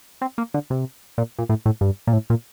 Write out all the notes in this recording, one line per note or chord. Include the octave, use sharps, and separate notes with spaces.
C4
A#3
D3
C3
A#2
A#2
A2
A2
G2
A#2
A2
A#2